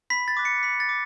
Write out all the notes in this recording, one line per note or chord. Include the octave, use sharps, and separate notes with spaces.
B5 B6
A6
D6 F#6
C#7
B5 B6
A6
D6